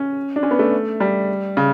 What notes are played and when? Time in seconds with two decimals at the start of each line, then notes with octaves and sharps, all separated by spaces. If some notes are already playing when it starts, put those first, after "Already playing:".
Already playing: C#4
0.36 D4
0.43 C#4
0.51 B3
0.59 A3
1.00 G3
1.57 C#3